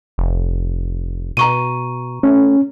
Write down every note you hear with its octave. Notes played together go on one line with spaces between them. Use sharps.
F1
B2 A#5 C#6 D#7
A3 C#4